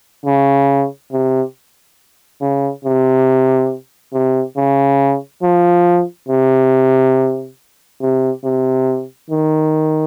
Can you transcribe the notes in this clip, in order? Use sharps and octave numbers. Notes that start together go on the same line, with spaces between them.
C#3
C3
C#3
C3
C3
C#3
F3
C3
C3
C3
D#3